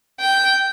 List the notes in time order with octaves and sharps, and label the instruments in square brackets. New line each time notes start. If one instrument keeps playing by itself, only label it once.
[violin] G5